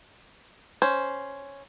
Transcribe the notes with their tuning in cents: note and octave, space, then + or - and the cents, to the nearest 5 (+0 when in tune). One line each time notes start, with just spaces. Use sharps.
C#4 +0 C5 +0